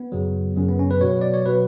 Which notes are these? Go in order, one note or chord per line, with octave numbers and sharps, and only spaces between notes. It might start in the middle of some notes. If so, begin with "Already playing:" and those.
Already playing: B3
F#2 C#3 F#3
F#2 C#3 F#3
B3
C#4
B4
B2 F#3 C#5
D5
C#5
B2 F#3 B4